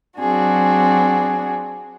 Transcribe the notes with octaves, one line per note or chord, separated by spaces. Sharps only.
F#3 C4 D4 F#4 G#4